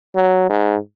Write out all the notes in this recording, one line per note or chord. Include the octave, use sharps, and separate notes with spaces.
F#3
G#2